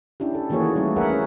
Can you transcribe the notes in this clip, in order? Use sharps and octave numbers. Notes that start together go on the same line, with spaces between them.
C#4 D4 E4 G4
A4
D#3 E3 A#3 F#4 G#4 C#5
G3 A3 C#4 E4
G#4 A#4 B4 C#5 E5 F#5
C#4